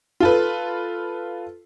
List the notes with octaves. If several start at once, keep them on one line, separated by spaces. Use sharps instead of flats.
F4 A4 B4